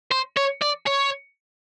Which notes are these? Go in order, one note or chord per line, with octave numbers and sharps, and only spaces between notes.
C5
C#5
D5
C#5